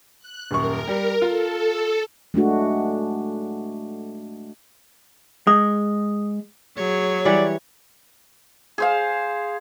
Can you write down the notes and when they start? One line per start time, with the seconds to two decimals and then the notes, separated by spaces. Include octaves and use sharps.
0.19 F#6
0.51 D#1 F#2 A#4 C#6
0.88 G3
1.22 F4 A4
2.34 G#3 A3 D4 F#4
5.47 G#3 D#6
6.77 F#3 G#4 C#5
7.25 E3 G3 D5 F#5
8.78 G#4 C5 F5